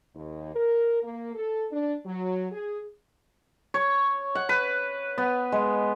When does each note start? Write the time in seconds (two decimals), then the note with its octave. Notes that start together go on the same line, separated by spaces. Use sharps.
0.14 D#2
0.55 A#4
1.02 A#3
1.34 A4
1.71 D4
2.05 F#3
2.52 G#4
3.74 C#5
4.35 F#5
4.49 B4
5.18 B3
5.52 G#3